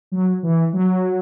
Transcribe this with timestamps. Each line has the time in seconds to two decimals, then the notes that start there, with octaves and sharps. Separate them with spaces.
0.12 F#3
0.43 E3
0.73 F#3